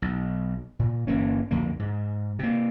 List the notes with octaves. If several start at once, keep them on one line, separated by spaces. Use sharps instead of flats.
B1
A#2
G1 E3 A#3 C#4
C2 F2 D3 A#3
G#2
C3 A#3